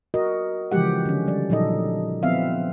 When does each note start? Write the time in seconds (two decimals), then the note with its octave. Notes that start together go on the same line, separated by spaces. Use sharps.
0.14 F#4 A#4 D#5
0.72 C#3 E3 F3 G#3 G4 F#5
1.05 D3 C#4
1.27 G3 D5
1.50 A#2 F3 F#3 D#4 A4 D#5
2.23 F3 B3 C4 E5 F5